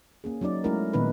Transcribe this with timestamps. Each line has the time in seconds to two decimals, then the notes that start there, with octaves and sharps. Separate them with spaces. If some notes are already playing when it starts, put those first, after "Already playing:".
0.24 A#3 C#4 G#4
0.41 F#3 C#4 D#4 D5
0.64 G#3 A3 C#4 E4 F#4 A#4
0.93 A#2 D#3 B3 D#4 B4